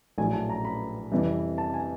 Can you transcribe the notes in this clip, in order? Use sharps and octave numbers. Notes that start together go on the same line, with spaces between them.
A#1 A2 F#3 G#5
A5
A#5
B5
F2 C3 E3 G3
A5
G#5